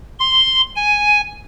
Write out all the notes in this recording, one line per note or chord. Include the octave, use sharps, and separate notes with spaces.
C6
G#5